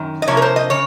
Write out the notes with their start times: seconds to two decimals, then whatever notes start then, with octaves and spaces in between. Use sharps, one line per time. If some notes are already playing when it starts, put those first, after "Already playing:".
Already playing: F#2 D#3
0.22 D#5
0.28 C3 F3 A#3 C#5
0.37 A#4
0.42 C5
0.56 D#5
0.70 C#3 C#5